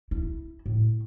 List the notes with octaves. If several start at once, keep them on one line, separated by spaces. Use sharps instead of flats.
E4
A2